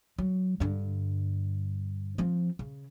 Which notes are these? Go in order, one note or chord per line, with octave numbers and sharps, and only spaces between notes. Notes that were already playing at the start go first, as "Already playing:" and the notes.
F#3
G2 D3
F3 C4
C#3